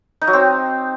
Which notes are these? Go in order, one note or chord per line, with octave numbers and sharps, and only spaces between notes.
D#4
F#3
C4